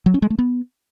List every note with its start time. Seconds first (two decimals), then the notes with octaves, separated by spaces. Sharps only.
0.06 F#3
0.14 C#4
0.22 G#3
0.30 A3
0.39 B3